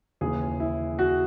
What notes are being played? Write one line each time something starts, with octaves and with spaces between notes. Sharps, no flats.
D#2 C#3 E3 G#4
E4
F#4